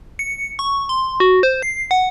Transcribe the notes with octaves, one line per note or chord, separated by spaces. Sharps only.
C#7
C#6
C6
F#4
C5
C7
F#5